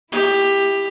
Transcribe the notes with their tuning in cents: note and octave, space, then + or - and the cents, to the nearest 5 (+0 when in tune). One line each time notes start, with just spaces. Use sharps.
E4 +0 G4 +15